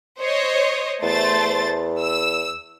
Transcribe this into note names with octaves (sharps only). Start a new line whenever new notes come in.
C5 C#5 D#5
E2 A3 C5 A6
E6